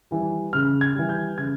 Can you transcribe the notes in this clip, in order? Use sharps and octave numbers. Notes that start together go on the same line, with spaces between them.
E3 G3
C#3 F6
G#6
E3 G3
G6
C#3 G#6